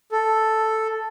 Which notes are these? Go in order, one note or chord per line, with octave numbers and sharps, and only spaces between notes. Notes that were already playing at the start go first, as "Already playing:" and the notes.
A4